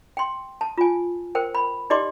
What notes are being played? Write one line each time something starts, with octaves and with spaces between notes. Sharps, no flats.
G5 C6
A5
F4 G#5
A#4 C5 G5
B5
D#4 G4 D5 D#5 C6 D6